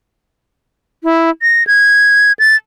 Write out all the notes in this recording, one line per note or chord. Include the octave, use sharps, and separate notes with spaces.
E4
A#6
G#6
A6